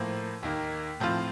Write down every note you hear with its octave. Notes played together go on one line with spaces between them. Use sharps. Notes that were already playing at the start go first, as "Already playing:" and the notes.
Already playing: A2 F3 A#3
D#2 D#3 A#3
A2 F3 C4 F4